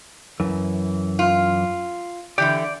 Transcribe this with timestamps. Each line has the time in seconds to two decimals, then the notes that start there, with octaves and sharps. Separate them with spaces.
0.40 F#2 E3
1.19 F4
2.38 D3 E3 G4 D5